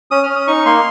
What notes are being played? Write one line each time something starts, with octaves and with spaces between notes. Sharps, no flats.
C#4 D#6
F6
C#4
D#6
D#4 C#6
A#3 C6